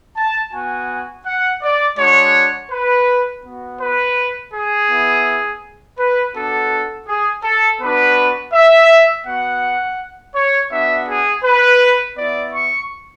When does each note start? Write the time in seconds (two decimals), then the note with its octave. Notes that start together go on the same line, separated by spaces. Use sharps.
0.17 A5
0.54 B3 F#4 G#5
1.26 F#5
1.63 D5
1.99 G#3 D4 F#4 C#5
2.72 B4
3.44 B3 F#4
3.81 B4
4.54 G#4
4.90 B3 E4
5.99 B4
6.35 B3 D4 F#4 A4
7.08 G#4
7.44 A4
7.81 B3 D4 F#4 B4
8.54 E5
9.27 B3 F#4 F#5
10.35 C#5
10.72 B3 D4 F#4 E5
11.08 G#4
11.44 B4
12.17 B3 E4 D5
12.54 C#6